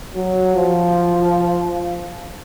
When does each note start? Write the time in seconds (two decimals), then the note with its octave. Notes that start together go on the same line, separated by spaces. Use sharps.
0.15 F#3
0.55 F3